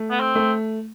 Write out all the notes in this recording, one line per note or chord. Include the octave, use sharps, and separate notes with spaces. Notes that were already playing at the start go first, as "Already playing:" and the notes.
Already playing: A3
B3
C4
A3